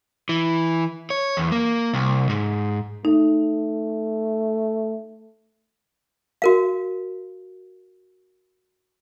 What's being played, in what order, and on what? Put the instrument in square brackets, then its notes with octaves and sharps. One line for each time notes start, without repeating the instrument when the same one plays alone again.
[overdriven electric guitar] E3
C#5
E2
A#3
C2
G#2
[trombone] A3 [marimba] D#4
[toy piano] F#4 A#4 F5